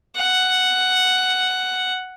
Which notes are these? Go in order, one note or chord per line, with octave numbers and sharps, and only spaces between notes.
F#5